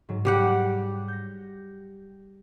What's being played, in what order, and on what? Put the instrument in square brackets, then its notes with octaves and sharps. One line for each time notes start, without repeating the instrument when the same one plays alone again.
[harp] G#2 F#3
[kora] G3 G4 F#5
[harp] G6 A#6